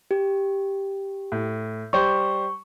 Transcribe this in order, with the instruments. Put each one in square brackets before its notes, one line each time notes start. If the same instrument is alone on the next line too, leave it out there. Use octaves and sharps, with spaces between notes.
[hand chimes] G4
[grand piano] A2
[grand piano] G3 G4 C5 [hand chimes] C#6